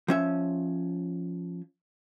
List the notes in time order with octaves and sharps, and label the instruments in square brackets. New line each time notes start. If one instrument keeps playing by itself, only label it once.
[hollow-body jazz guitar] F3 C#4 E5